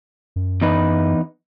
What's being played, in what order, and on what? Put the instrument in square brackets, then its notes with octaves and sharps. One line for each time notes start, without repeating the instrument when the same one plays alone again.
[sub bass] F#2
[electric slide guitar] E2 D#4 B4